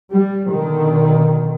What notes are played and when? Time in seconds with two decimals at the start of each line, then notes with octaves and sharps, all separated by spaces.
0.11 G3
0.49 B2 D3 D#3